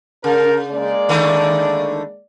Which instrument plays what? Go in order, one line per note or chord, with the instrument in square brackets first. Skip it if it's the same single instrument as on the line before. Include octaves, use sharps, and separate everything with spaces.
[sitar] C#3 [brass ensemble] A#4
[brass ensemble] G#3 A#3 D5
[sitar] D3 D#3 A3